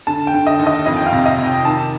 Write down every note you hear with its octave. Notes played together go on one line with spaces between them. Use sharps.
D3 A5
G5
D3
D#5
D#2
D#5
F2 D#5
G5
F5
C3
D#5
C3
G5
D#3 A5